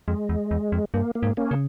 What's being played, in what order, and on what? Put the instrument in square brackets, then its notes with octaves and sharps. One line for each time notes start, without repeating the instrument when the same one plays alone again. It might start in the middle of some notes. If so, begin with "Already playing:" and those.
[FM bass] F2 [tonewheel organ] G#3
[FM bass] E2
E2
F2
[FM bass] G2 [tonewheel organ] A#3
[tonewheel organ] A#3
[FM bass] G#2
[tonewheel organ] A#3 C#4
[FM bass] C#3